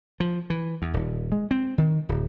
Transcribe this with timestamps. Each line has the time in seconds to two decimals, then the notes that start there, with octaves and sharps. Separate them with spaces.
0.20 F3
0.50 E3
0.82 E2
0.94 D#1
1.32 G#3
1.51 C4
1.78 D#3
2.09 D1